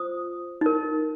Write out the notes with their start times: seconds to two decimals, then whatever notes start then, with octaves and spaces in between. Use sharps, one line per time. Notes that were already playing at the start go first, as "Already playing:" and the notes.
Already playing: F4 C5 D#6
0.61 D#4 A#4